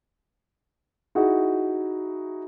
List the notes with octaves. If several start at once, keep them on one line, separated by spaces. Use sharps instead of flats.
D#4 E4 F#4 G#4